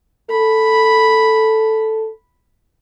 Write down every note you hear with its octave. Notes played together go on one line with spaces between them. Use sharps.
A4 B5